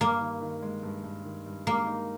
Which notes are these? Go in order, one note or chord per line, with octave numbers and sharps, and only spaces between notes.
G2 A#3
D#3
D#3
G#3
G2
G2
D#3
G2
G#3 A#3
D#4